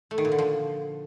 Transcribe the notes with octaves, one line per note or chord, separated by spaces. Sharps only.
A3
D#3
A#2
D3
F3